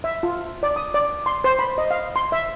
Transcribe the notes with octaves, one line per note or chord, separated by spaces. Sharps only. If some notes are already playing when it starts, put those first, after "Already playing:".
E5
F4
D5
D#6
D5
C6
C5
B5
D#5
F5
C6
E5